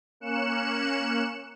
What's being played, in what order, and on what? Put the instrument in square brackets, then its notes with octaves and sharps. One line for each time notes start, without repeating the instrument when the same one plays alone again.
[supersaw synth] A#3 C#4 F#6 C#7 E7